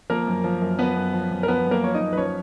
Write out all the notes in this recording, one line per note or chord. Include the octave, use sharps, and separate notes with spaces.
F3 A#3 A#4
F#2
F3
F#2
F3 B3 B4
F#2
F3
F#2
A#4
F3 B3 B4
F#2
A#3 A#4
F3 C#5
D#4 D#5
F#2
B4
F3 C#4 C#5